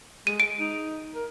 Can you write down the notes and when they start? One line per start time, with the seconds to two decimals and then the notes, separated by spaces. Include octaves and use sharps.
0.27 G#3 D#7
0.40 D7
0.59 D#4
1.15 A#4